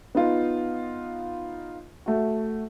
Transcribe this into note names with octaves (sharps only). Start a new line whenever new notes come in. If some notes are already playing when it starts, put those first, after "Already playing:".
B3 D#4 F4
A3 F#4